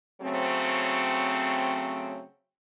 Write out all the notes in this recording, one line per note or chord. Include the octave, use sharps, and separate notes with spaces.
C#3 F#3 A3 C4